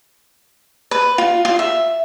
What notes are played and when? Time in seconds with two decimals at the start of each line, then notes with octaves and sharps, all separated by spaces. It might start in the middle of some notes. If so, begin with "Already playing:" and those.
0.91 B4
1.18 F4
1.45 F4
1.59 E5